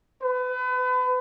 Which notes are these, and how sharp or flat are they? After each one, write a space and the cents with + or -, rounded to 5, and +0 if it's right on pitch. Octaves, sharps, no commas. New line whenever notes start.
B4 +35